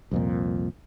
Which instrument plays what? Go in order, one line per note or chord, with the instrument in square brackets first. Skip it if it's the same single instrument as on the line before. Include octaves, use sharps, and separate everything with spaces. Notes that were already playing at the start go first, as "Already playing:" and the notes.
[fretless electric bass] C2 F2 A#2